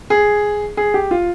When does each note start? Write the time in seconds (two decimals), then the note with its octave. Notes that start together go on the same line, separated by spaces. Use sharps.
0.10 G#4
0.77 G#4
0.94 G4
1.11 F4